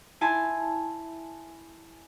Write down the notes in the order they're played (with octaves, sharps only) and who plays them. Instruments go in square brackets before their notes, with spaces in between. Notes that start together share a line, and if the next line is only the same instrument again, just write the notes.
[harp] E4 G#5 A5 B5 C6